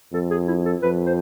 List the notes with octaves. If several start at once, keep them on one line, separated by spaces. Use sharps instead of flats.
F2 A4
G#4
E4
A4
F2 B4
C5